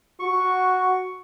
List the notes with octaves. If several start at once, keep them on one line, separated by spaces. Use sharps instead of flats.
F#4 C#6